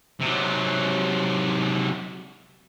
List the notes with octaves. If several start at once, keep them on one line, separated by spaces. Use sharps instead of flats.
C3 F#3